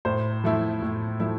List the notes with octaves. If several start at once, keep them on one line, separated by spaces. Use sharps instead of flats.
A2 C5
F3 A3 E4
A2
F3 A3 E4